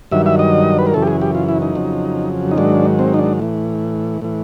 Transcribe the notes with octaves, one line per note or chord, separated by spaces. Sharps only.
G2 D#3 F#3 E5
E5
D#5
B4
A#4
F#2 C#3 E3 A4
G4
G#4
G4
F4
E4
D#4
F2 C#3 F#3
D#4
G#2 D#3 F#3 D4
C4
D#4
D4
A2 E3
A2 E3